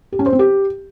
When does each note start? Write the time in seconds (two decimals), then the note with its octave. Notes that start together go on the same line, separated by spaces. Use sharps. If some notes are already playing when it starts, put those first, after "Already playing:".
0.12 G4
0.19 C#4
0.26 C5
0.33 C4
0.39 G4